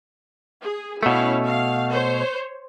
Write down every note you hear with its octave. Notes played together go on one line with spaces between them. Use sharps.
G#4
B2 A3 C#4 E4 F5
F5
C5 C#5